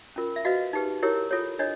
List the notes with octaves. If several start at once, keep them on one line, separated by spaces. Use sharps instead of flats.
C#4 F4 A#4
E5
F#4 B4 D#5 F5
D#4 G4 B4
E4 G4 A#4 C#5
F4 A4 C#5
D4 C#5 D#5